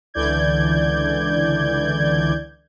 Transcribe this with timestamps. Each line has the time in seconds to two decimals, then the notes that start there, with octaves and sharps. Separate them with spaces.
0.14 C#2 D3 E3 D5 G6 G#6